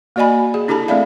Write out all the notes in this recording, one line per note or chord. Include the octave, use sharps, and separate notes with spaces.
A#3 F#4 D5 D#5 G#5 B5
G#4
D4 E4 G4 A4 A5 B5
A3 C4 E4 D5 E5 F5